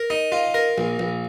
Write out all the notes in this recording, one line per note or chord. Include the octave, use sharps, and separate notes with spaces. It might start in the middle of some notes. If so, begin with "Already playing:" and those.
Already playing: A#4
D#4
F4
A#4
A#1
A#1